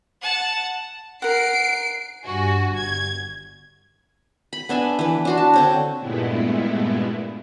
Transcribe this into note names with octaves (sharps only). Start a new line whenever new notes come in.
F#5 A5
A#4 F#5 C7 D7
G2 F#4 G#5
G1 G#6
B5
B3 D4 E5 G#5
E3 B4
D4 F#4 C6
A5
D3 C4 C#5
G2 A#2 G#3 A3 B3 E4